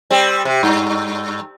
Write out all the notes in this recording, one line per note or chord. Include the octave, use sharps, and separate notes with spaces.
G3 C4
C3
G2